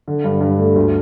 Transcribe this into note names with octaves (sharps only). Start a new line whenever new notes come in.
D3
G2
G2
A3
D2